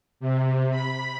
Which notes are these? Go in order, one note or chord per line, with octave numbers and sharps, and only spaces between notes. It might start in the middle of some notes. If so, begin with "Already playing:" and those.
C3
B5